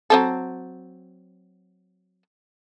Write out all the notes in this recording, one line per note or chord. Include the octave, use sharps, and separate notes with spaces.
F#3 C4 A4